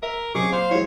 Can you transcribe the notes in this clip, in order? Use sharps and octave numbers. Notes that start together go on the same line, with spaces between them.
A#4 E5
C#3 F#3 C4 G4 G#4 C#6 D6
A#2 C5 F5
F#2 E3 G#3 E4 C#5